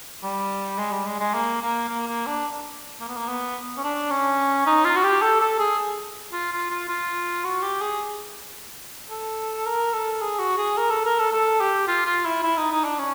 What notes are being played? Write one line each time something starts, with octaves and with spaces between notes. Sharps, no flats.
G3
G#3
G3
G#3
G#3
A#3
A#3
A#3
A#3
D4
A#3
B3
A#3
B3
C#4
D4
C#4
D#4
F4
F#4
G4
A4
A4
G#4
F4
F4
F4
F4
F#4
G4
G#4
A4
A#4
A4
G#4
F#4
G#4
A#4
A4
A#4
A4
A4
G4
F4
F4
E4
E4
D#4
D#4
D4
C#4